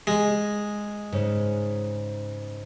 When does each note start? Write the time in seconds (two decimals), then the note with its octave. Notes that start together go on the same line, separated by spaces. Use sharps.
0.07 G#3
1.12 G#2 C#3